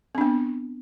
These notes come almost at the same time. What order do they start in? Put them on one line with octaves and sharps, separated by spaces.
C4 D4 B3